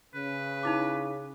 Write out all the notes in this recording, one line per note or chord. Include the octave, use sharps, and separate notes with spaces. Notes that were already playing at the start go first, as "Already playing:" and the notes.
C#3 B4
D#4 E4 D6